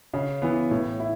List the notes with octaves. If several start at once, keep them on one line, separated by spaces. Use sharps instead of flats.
C#3
E3 B3
A2
E4